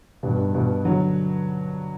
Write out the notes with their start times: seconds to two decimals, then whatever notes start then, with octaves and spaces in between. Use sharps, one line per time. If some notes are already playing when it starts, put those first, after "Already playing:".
0.23 G2 B2
0.38 G2
0.54 G2 B2
0.85 D3 F#3